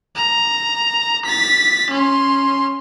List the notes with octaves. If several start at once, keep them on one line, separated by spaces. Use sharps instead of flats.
A#5
A6 B6
C#4 C6